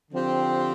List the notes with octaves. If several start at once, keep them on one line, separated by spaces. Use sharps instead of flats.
D3 F3 C4 G4